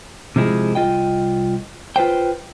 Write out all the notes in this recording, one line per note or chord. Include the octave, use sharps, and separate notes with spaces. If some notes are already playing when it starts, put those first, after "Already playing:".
C3 F3 G#3 E4 G#4
C2 F4 D#5 G5
F4 B4 C5 G5